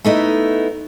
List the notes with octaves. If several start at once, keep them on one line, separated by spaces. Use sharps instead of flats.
A3 B3 D#4 E4